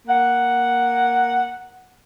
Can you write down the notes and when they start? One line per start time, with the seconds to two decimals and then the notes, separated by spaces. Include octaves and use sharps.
0.08 A#3 F#5